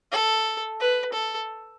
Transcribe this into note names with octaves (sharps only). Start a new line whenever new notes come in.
A4
B4
A4